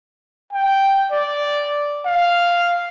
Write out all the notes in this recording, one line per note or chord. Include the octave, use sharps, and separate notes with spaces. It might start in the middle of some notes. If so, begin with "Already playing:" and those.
G5
D5
F5